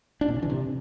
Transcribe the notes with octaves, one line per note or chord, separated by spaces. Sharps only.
D4
A#2
C#3
E3
C3